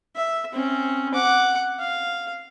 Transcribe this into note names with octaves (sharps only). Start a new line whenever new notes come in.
E5
C4 C#4
F#5 D6
F5